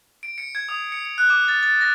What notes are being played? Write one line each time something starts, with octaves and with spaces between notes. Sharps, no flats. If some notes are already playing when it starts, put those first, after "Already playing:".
D7
C#7
G#6
D#6
C#7
C#7
F#6
D6
A6
A6
A#6